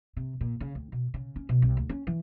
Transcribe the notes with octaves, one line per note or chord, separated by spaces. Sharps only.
C3
A#2
C#3
D2
B2
C#3
C#4
B2
C2
D2
C#4
E3